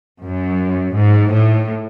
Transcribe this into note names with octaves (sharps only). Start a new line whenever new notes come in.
F#2
G#2
A2